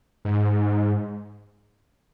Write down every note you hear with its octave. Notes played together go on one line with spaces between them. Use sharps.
G#2